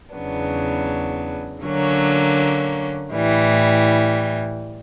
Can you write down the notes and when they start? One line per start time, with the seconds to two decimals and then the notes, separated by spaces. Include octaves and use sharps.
0.14 E2 C#3 F#3 B3 D4
1.63 D3 F#3 A#3 C#4
3.13 A2 E3 G3